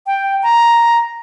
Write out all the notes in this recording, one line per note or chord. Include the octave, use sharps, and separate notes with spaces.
G5
A#5